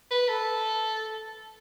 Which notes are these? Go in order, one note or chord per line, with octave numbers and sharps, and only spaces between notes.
B4
A4